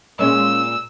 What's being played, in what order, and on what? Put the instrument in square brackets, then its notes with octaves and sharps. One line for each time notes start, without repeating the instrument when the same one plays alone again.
[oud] A#2 G#3 [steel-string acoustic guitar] A#3 C#4 D#5 [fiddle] E6